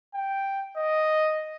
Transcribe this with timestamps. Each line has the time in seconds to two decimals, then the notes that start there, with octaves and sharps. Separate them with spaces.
0.14 G5
0.77 D#5